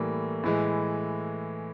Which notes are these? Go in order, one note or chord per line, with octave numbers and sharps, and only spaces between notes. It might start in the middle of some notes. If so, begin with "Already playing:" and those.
Already playing: A2 E3 G3 A#3
A2 E3 G#3